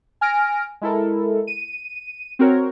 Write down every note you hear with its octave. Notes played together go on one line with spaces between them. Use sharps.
G#5 F6 A#6 D7
G#3 E4 A4 A#4
D#7
C4 F#4 A#4 C#5